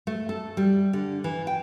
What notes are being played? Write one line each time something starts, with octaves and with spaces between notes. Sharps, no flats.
A3
A4
G3
D3
E3
G5